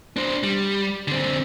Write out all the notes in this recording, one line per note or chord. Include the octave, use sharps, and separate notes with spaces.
D4 C5
G3
D3 C4